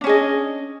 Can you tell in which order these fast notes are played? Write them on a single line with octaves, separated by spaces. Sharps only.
D4 C#4 G#4 D#5